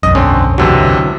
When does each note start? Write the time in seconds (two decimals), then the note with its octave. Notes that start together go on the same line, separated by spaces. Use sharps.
0.03 E1 B1 F#2 D#5 D#6
0.15 D3 C4 C#4
0.58 A1 D2 C3 E3 F#3